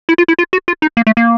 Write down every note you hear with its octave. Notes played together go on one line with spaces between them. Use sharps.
E4
F4
E4
F4
F#4
F4
D#4
A#3
A3
A#3